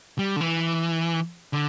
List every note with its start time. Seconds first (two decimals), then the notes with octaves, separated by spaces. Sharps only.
0.19 G3
0.36 D3
0.41 E3
1.53 D3